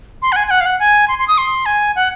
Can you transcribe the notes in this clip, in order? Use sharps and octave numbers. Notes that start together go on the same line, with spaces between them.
C6
F#5
G#5
G#5
F#5
F5
F#5
G#5
C6
C6
D#6
C6
G#5
F#5